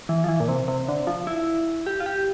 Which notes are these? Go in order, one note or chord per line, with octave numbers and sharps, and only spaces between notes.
E3
F3
E3
A#2
C3
C3
D3
F3
E4
G4
F4
G4